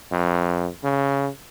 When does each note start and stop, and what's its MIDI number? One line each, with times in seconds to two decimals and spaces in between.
0.12 0.69 41
0.83 1.29 49